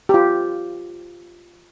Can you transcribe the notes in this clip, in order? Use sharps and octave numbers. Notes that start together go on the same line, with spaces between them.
G4
F4